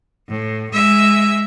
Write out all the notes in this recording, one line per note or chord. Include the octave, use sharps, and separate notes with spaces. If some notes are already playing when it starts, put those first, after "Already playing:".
A2
G#3 E5